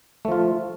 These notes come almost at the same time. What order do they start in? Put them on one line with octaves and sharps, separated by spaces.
A3 F3 F4